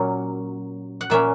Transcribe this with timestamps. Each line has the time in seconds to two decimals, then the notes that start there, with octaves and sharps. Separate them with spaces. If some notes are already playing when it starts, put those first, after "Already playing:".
Already playing: A#2 F#3 A#3 C#4
1.01 F#5
1.10 A#2 A#3 C#4 E5